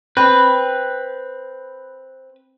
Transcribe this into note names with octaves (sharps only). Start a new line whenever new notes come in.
C4 B4